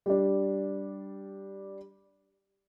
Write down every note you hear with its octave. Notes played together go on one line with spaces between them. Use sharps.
G3 D4